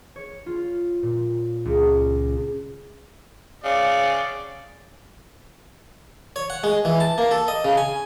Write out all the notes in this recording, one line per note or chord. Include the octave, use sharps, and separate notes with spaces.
C#5
F4
A#2
C#2
C#3 D5
C#5
F#5
G#3
E3
A5
A#3
A4
D#5
C#3
G#5